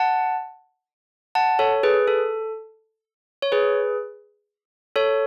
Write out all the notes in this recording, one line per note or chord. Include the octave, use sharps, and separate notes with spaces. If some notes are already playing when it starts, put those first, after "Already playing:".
Already playing: F#5 A5
F#5 A5
A4 C#5
G#4 B4
A4
C#5
G#4 B4
A4 C#5